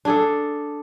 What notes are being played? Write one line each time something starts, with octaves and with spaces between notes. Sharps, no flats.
D4 G#4 A4